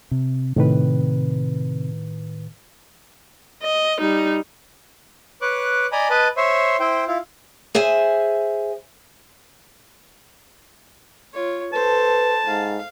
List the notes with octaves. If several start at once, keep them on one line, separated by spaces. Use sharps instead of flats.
C3
A2 C3 D#3 B4
D#5
G3 D#4
B4 C#5 D6 F#6
D5 D#5 G#5 A#5 B5 D#6
B4 D#5 A5 B5
C5 C#5 E5 C6
E4 C5 G5
E4 F4
G#4 C5 E5 G#5
F4 C#5
A4 B4 C5 A5
G#2 F5